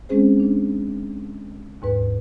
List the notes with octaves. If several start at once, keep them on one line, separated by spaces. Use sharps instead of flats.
G#3 C4 C#4 G#4 C5
D4
D#2 G#2 B4